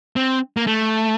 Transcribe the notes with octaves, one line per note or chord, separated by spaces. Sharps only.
C4
A#3
A3